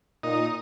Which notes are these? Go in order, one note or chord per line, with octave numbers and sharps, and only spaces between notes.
A#2 D#4